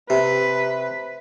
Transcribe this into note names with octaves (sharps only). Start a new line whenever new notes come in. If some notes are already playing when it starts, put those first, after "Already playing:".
C3 G4 B4